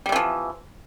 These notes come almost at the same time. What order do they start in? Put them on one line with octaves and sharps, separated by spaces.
G3 C3 E3 F3